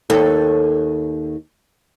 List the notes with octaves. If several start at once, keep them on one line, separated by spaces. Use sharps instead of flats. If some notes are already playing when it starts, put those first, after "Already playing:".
D#2 A4